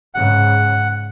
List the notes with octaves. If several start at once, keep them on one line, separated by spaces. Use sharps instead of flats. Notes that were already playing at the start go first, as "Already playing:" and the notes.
G#2 C#3 F#5